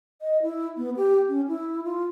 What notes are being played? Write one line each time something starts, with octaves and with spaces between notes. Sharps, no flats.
D#5
E4
B3
G4
C#4
E4
F4